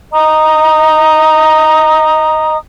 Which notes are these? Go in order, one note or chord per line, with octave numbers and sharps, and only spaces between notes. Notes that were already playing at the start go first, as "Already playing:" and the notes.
D#5 A#5 D#6